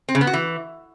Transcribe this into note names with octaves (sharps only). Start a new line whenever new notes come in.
C4
C#3
B3
F#4
E3